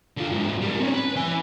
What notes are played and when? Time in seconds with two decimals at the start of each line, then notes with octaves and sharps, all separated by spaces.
0.17 D3 F4
0.32 G#2 F#3
0.61 G3 A#3
0.80 C4 C#4
0.94 B4
1.16 E4 G#5